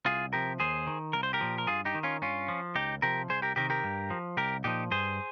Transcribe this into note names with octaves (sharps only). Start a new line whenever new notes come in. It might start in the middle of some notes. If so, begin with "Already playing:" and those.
C2 F4 G#4
C3 F3 G4 A#4
D#2 G#4 C5
D#3
C2 A#4
C5
G4 A#4
A#2 F3
A#4
G2 F4 G#4
D#4 G4
D#3
C#4 F4
G2 C#4 F4
F3
C#2 D#4 G4
C3 F3 G4 A#4
C2 G#4 C5
G4 A#4
C3 D#3 G4 A#4
G4 A#4
G2
F3
C2 G4 A#4
A#2 F3 D#4 G4
G2 G#4 C5